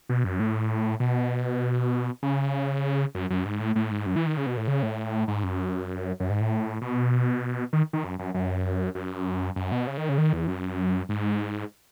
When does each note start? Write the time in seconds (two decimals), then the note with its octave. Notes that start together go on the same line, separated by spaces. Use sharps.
0.09 B2
0.25 F#2
0.40 A2
1.00 B2
2.23 C#3
3.15 F#2
3.30 F#2
3.45 G#2
3.60 A2
3.76 A2
3.91 G#2
4.06 F#2
4.16 E3
4.26 D#3
4.37 C#3
4.46 B2
4.57 A2
4.68 C#3
4.83 A2
5.28 G#2
5.43 F#2
6.20 F#2
6.30 G#2
6.41 A2
6.81 B2
7.73 D#3
7.93 D#3
8.04 F#2
8.19 F#2
8.34 F#2
8.95 F#2
9.56 F#2
9.72 B2
9.87 C#3
9.97 D#3
10.09 C#3
10.18 D#3
10.33 E2
10.48 F#2
11.09 G#2